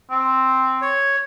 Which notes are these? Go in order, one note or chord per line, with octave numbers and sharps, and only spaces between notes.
C4
C#5